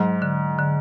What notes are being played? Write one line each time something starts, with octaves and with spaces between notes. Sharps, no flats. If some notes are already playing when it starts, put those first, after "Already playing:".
Already playing: G#2 F#3
D3
D3